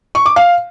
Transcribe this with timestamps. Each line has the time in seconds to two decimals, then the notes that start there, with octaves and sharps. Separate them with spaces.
0.15 C#6
0.26 D6
0.36 F5